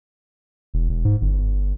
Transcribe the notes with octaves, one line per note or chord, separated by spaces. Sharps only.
E1
E1
G#2
G1